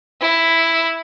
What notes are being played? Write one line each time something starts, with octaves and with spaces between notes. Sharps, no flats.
E4